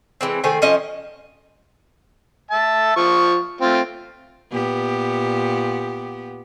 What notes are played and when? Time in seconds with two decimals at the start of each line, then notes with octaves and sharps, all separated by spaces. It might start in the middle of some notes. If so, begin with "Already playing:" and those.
0.21 E3 G#3 C4
0.44 D#3 A3 C5 G#5
0.62 F3 C#4 D#5
2.51 E5 A5
2.96 F3 C#6
3.61 A3 C4 F4
4.52 A#2 B3 G4